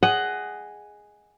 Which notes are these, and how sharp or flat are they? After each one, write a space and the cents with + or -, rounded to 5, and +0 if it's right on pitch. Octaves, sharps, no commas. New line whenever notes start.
G#4 +0 D#5 +0 F#5 +15